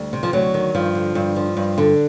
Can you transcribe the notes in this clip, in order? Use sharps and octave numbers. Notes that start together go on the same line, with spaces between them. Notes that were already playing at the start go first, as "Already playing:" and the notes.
Already playing: D2 G3
C3
F3
D2 F#3
D#3
G2 F3
D3
G2
F3
G2
D3